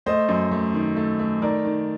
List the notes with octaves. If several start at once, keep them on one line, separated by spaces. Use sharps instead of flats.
A3 C5 D#5
F#2
A3
D#3
A3
A3
D#3 A#4 D5
D#3